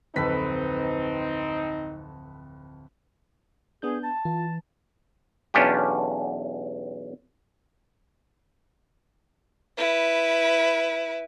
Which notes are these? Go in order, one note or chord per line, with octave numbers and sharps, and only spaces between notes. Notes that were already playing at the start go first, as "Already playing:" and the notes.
D1 F2 C4 D#4 A4 B4 B6
B3 D4 G#4 G6
A5
E3 F4
B1 E2 C#4 D4 F4 G4
E4 B4